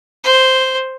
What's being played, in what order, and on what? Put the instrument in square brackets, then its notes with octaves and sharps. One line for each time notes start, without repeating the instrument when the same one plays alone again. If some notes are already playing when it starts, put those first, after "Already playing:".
[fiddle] C5